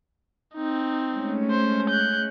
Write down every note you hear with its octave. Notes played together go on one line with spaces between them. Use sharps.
C4 D#4
G#3 A3 C#4
C5
F#6 G6